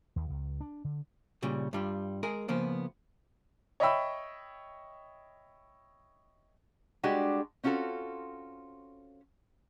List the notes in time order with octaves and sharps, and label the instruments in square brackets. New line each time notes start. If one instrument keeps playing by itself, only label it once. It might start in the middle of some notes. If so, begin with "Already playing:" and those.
[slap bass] D#2
C#2
D4
D3
[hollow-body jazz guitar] A#2 C#3 G3
G2 G3 F4
G#3 G#4 A#4
C#3 F3 A#3 B3
[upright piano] C#5 D#5 E5 G5 B5 E6
[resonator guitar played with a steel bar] G3 G#3 D4 F#4 G4
C4 C#4 F4 F#4 A4